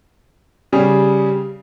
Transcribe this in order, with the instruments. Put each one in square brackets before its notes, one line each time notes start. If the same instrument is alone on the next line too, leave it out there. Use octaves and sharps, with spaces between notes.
[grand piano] C#3 G3 G#4